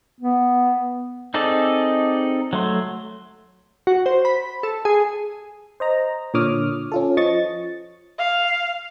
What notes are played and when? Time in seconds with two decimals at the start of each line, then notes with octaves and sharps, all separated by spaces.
0.20 B3
1.34 C4 D#4 G#4 A4 D5
2.53 F#3 A3 C6
3.87 F#4
4.06 C5
4.25 B5
4.63 A4
4.85 G#4
5.80 C5 D#5 A#5
6.34 A#2 D3 C#5 D6 D#6 F6
6.92 C#4 F4 A4
7.17 F3 D#5 C#6 A6
8.19 F5